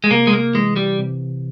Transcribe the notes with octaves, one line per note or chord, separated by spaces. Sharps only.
G#3
C3 A#3
G#3
A#3
E3 G#3
G3
C3